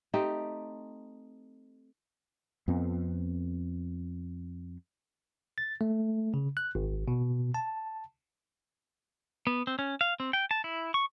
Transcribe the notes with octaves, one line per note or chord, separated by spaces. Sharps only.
A3 C4 D#4 G4
F2 B3 C4
A6
A3
C#3
F#6
G#1
B2
A5
B3
C4
C#4
F5
C4
G5
A5
E4
C#6